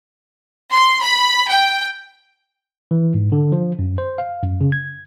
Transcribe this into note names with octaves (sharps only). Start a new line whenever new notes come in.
C6
B5
G5
E3
G#2
D3
F3
F#2
C5
F5
F#2
C#3
G#6